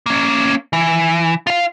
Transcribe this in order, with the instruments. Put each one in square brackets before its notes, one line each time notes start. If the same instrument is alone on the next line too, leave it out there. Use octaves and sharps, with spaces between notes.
[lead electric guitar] A#3 C#4
E3
F4 F5